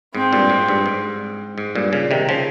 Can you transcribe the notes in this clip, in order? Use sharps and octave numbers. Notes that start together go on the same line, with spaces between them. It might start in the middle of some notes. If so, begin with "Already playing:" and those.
G#2 C4
G2 A#2
G#2
G2
G#2
G#2
G2 A#2
A#2 C#3
C3 D#3
C#3 F3